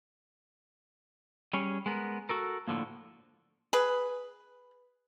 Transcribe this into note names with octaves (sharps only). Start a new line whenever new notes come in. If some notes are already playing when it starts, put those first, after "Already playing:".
G3 C#4 G#4 C#5
G#3 B3 A#4
F#4 A4 A#4
A2 D3 F3 A#3
G#4 B4